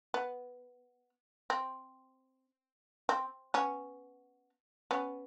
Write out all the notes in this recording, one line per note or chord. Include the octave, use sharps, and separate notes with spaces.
B3
C4
C4
B3 C#4
B3 C#4